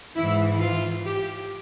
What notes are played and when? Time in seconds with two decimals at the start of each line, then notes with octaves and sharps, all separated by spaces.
0.16 G#2 E3 E4
0.61 F4
1.05 G4